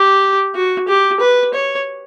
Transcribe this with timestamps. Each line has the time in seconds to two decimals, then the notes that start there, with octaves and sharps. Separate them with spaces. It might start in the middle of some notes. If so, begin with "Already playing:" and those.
Already playing: G4
0.55 F#4
0.88 G4
1.20 B4
1.54 C#5